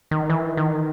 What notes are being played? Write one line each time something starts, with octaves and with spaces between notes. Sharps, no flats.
D#3
E3
D#3